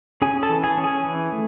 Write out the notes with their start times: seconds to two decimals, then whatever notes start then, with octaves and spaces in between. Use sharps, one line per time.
0.22 C#4 G#4 G#5
0.43 A4 A5
0.49 E3
0.64 G#4 G#5
0.78 C#4
0.84 G#4 G#5
1.05 E3
1.32 A3